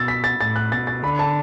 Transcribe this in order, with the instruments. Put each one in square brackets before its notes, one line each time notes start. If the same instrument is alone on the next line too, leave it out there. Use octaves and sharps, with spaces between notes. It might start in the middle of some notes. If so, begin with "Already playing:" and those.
Already playing: [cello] B2 [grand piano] E6 A6
[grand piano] B6
A6
[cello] A2 [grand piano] A6
[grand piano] F#6
[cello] B2 [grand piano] A6
[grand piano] A6
[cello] D3 [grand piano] B5
[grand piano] A5